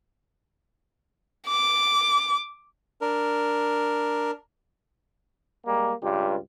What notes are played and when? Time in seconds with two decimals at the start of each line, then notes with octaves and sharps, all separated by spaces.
1.48 D6
3.01 D4 A#4
5.66 G3 G#3 A#3
6.03 C#2 G2 F4 G4